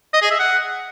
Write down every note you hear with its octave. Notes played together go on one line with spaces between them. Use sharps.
D#5
G#4
E5
F#5